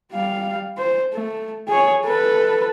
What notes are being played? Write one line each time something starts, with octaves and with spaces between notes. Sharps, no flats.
G3 F5
C5
A3
G#4 C#5
A4 B4